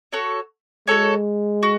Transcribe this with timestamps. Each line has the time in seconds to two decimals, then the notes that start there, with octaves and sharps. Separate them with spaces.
0.12 F#4 A4 C#5
0.87 G#3 F#4 A4 C#5
1.63 F#4